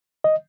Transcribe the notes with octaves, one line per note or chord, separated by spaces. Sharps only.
D#5